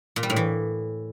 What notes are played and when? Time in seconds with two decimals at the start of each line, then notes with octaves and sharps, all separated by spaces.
0.16 A#2
0.23 G3
0.30 A2
0.36 E3